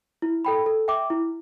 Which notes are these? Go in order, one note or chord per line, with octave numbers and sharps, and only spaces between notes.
E4
A4 G5 B5
A4
E5 G5 D6
E4